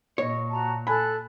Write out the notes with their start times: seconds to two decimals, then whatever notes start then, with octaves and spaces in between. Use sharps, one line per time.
0.18 A#2 C#5 D#5
0.51 F#4 A5 A#5
0.87 A4 G#5 A5 B5 F#6